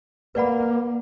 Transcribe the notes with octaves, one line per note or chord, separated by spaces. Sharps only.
A#3 B4 D5 F#5 B5